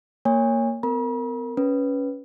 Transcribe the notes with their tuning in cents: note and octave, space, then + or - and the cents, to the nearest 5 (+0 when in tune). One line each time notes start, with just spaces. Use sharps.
A#3 -10 C#5 +0 G#5 -35
B3 +45 A#4 -20 B5 -45
C#4 +10 B4 +0